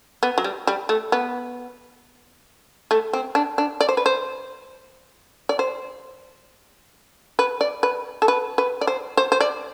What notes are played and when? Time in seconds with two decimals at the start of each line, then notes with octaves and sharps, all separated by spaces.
0.23 B3
0.38 F#3
0.44 G3
0.67 G3
0.89 A3
1.12 B3
2.91 A3
3.13 C4
3.35 D4
3.58 D4
3.81 D5
3.89 C5
3.97 B4
4.06 C5
5.49 D5
5.59 C5
7.39 B4
7.61 D5
7.83 B4
8.22 A4
8.28 B4
8.58 B4
8.81 D5
8.87 C5
9.17 C5
9.32 C5
9.41 D5